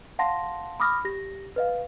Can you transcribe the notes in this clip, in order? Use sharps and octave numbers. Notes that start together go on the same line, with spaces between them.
F5 F#5 A5 C6 A#6
B5 D6 D#6 F6 A#6
G4 A#6
B4 D#5 F5